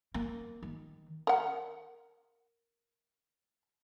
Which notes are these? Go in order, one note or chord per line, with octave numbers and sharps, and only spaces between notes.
A#3
D#3
A#4 F#5